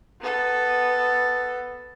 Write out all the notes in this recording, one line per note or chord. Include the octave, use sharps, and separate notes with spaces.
B3 A4